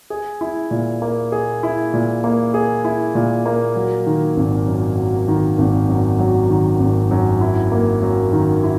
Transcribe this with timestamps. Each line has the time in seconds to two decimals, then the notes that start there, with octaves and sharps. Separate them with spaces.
0.10 G#4
0.41 E4
0.71 A#2
1.02 A#3
1.32 G#4
1.63 E4
1.93 A#2
2.24 A#3
2.54 G#4
2.85 E4
3.15 A#2
3.46 A#3
3.76 F#3
4.07 D#3
4.37 G#1
4.68 F#2
4.97 F#3
5.28 D#3
5.58 G#1
5.89 F#2
6.19 F#3
6.50 D#3
6.80 G#1
7.11 F#2
7.41 E4
7.72 A#3
8.03 F#2
8.32 D#3
8.64 E4